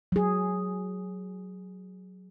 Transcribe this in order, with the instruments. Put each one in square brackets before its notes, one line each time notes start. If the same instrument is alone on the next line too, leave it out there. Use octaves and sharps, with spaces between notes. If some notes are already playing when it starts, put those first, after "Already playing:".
[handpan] F#3 G#4